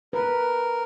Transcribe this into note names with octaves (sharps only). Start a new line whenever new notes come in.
A#4 B4